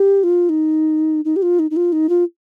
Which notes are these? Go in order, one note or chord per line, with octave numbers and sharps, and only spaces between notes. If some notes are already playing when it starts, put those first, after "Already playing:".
Already playing: G4
F4
D#4
D#4
G4
F4
D#4
D#4
F4
D#4
F4